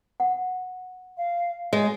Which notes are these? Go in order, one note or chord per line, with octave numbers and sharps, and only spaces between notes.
F#5
F5
G#3 C#5 D#5 G#5